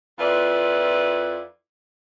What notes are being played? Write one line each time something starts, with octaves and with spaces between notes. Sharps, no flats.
F2 E4 F4 B4 D5